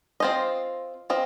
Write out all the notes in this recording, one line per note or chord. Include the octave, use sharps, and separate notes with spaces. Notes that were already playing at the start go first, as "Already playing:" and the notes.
C4 F4 C5 D#5
C4 F4 D#5